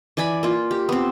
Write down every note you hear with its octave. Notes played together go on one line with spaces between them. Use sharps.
E3 D5 G#5 B5
A#3 F4
G4
B3 C4